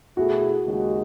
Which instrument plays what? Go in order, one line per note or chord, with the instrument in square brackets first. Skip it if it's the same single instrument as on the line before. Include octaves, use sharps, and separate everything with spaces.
[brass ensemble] B2 A3 E4 G#4 [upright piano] F#4
[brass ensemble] D#2 C#3 G#3 D#4 F#4